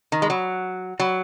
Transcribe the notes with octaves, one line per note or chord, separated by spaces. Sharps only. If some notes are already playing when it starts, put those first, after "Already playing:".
D#3
G#3
F#3
F#3